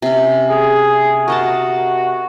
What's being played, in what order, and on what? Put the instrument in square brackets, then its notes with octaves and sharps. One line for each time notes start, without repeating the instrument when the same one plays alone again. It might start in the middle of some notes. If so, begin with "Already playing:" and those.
[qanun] C3 C#4
[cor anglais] G#4
[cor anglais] F#4 [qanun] A#4 D#5 A5